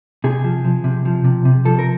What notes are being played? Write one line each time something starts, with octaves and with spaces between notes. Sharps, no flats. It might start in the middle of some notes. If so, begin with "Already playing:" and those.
C3 G#4
F3
F3
C3
F3
C3
C3
F3 A4
A#4